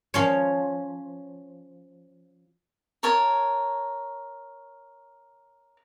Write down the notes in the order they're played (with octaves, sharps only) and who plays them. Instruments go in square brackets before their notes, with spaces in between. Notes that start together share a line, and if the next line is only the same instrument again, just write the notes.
[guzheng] F3 C#4 C#5
[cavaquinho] A#4 C#5 A5